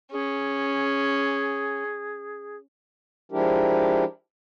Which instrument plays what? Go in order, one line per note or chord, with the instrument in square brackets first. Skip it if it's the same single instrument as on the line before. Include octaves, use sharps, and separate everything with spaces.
[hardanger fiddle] C#4 [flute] G#4
[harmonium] F3 G#3 D4 E4 G4 A#4